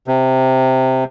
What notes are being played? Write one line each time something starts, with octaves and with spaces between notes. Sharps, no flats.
C3